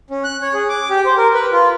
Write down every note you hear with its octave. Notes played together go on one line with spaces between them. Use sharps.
C#4
F#6
C#5
G#4
D6
G4
C5
A#4
B4
F4